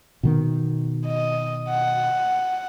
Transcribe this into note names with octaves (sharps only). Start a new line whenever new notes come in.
B2 D#3 B3
D#5
F#5